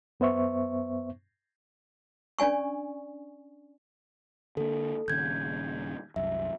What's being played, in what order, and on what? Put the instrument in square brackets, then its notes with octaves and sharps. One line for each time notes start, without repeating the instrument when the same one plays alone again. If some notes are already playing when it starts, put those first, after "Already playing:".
[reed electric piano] F#2 B3 C5 E5 C#6
[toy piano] C#4 D4 D5 G#5 C#6
[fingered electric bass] D3 A#3 [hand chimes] A4
[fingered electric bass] D#1 D#2 C#3 [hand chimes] G6 G#6
[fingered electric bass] C2 F#2 [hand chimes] E5